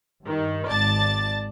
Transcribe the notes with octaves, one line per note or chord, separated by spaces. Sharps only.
G2 D#3
G#1 D5 A5 A6